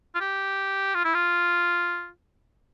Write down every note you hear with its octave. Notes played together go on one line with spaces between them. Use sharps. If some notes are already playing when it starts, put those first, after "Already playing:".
F4
G4
F4
E4
F4